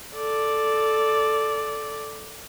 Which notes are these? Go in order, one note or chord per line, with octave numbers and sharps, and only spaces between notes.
A4 D5